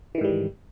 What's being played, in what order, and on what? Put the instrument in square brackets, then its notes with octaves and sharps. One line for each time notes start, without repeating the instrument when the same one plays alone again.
[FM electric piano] E3
D#3
G#2
G3